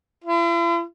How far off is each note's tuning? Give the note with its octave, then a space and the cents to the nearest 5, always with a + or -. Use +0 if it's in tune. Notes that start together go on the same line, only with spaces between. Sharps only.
E4 +45